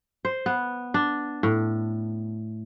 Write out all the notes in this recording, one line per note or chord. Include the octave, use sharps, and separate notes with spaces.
C5
B3
D4
A2